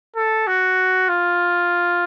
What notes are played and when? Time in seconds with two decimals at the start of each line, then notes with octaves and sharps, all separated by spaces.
0.16 A4
0.47 F#4
1.08 F4